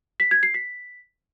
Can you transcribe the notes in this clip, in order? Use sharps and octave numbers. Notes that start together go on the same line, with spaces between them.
B6
G#6
C7
B6